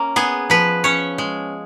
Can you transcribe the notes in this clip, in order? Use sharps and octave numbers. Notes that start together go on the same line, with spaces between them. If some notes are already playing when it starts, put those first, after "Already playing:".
Already playing: A#3 C#4
B3 G#4
F3 B4
C#4 C#5
G#3